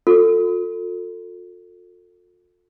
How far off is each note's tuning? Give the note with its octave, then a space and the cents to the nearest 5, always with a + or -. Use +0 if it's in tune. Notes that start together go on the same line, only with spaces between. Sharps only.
F4 +40 A4 +20